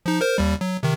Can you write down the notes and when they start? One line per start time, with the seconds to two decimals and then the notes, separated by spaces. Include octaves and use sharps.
0.06 F3 D#4
0.21 A#4 C5
0.38 D#2 G3
0.61 F#3
0.83 C3 D#3